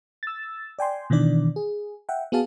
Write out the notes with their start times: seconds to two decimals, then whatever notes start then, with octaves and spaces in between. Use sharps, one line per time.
0.23 E6 A6
0.79 D5 G5 G#5 C6
1.10 B2 D#3 E3 D4 D5
1.56 G#4
2.09 E5 F#5 G5
2.32 B3 F#4 G#4 F5 A5